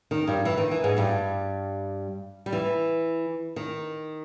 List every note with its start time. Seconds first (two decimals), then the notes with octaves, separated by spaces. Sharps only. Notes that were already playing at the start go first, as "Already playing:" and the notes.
0.11 D#3
0.27 G2 G3
0.45 E3
0.58 D#3
0.71 E3
0.84 G#2 G#3
0.96 G2 G3
2.46 G3
2.53 E3
3.56 D#3